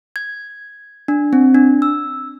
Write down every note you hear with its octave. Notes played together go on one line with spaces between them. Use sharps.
G#6
D4
C4
D4
E6